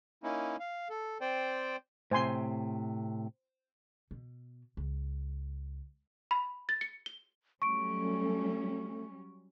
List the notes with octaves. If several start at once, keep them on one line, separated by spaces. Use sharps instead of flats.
A#3 C#4 D#4 E4
F5
A4
C4 C5 D5 G5
A2 C3 C5 G#5 C6
B2
C#2
B5
A6
C#7
G7
F#3 G3 A3 C#4 C#6 D7